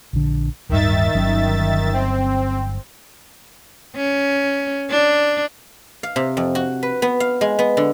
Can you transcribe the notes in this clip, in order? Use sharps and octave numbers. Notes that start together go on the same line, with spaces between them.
A#1 D3
D1 G2 D#3 E5 A6
G1 F#3 C#4
C4
C#4
D4
F5
C3
F2
F#4
B4
B3
F5
G#3
B3
D3